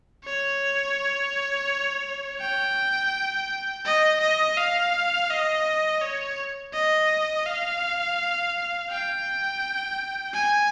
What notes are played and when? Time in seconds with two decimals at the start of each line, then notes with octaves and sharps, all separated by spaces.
0.25 C#5
2.41 G5
3.85 D#5
4.21 D#5
4.58 F5
5.30 D#5
6.01 C#5
6.74 D#5
7.46 F5
8.90 G5
10.34 G#5